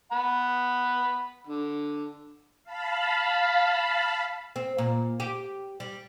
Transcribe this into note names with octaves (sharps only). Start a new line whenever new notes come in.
F#5 B5
D3
F5 A5 B5
C4
A#2
G4
G3